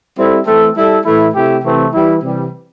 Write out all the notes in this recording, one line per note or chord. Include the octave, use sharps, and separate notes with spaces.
G3 C4 E4 A4
E3 A3 C4 A4
G3 E4 A4
A2 E3 A3 E4
C3 A3 E4 G4
C3 E3 A3 C4
E3 G3 E4
C3 E3 G3